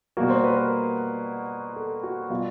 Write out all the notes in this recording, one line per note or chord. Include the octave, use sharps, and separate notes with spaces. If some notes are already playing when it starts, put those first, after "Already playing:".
B2 G3 A#3 F#4
C5
B4
A#4
A4
F#4
B2 G3 B3 F4